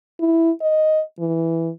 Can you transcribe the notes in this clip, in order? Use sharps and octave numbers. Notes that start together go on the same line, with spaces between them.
E4
D#5
E3